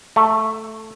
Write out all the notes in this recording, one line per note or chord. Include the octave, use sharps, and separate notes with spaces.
A3